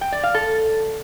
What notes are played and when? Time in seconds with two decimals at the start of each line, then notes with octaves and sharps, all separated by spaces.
0.01 G5
0.12 D5
0.23 F5
0.34 A4